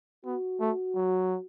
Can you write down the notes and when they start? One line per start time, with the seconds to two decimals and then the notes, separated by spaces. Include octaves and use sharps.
0.25 B3 F#4
0.60 A3
0.95 F#3